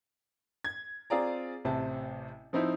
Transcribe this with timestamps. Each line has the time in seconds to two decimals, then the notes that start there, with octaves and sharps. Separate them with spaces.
0.64 G#6
1.10 C4 F4 G#4 D5 A#5
1.65 A1 C3 C4 A5
2.53 F3 C4 D#4 E4